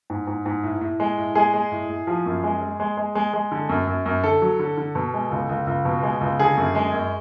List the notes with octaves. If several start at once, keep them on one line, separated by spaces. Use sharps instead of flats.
G#2
G#2
G#2
A2
A2
G#3
A2
G#3 G#4
G#3
A2
A2
F3
F#2
G#3
G#3
G#3
G#3
G#3
G#3
D3
F#2
F#2
F#2
D3 A4
F#3
D3
D3
B2
G#3
C#2
C#2
C#2
B2
G#3
C#2
D3 G#4
F#2
G#3
F#2